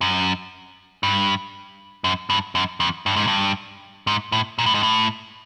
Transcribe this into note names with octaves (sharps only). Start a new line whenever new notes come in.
F#2
G2
F#2
G2
F#2
F2
G2
G#2
G2
G#2
A2
A#2
A2
G#2
A2